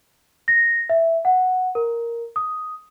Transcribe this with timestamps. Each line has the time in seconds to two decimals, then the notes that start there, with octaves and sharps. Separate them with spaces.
0.48 A#6
0.89 E5
1.25 F#5
1.75 A#4
2.36 D#6